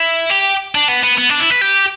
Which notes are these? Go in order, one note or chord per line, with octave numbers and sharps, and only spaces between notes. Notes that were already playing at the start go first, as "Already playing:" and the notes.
Already playing: E4
G4
D4
B3
B3
B3
D4
E4
B4
G4